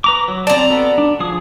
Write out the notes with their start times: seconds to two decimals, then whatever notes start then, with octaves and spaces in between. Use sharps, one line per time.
0.04 B4 A#5 D6
0.28 F#3
0.47 C4 D5 A5 A#5
0.70 B3 F#4 A4
0.98 D4
1.20 F3 G#4 D#6